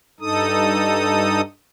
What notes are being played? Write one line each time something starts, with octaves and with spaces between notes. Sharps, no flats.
G2 D#4 A4 D#6